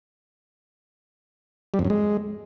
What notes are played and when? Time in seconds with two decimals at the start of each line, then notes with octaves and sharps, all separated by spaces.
1.74 G3
1.79 F2
1.85 F#2
1.90 G#3